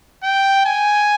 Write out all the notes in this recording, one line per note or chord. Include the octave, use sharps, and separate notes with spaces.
G5
G#5